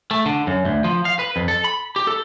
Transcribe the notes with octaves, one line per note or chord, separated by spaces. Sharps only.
A3
D3
F#2
D2
F3
F5
B4
F2
A4
B5
G4
A4